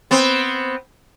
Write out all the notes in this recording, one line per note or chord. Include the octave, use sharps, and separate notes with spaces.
B3 C4